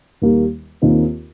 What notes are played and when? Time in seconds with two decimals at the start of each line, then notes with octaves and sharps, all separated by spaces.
0.22 D#2 D#3 G3 A#3
0.82 D#2 D#3 C4 F4